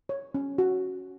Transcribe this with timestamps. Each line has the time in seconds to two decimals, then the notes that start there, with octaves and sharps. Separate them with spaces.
0.09 C#5
0.35 C#4
0.58 F#4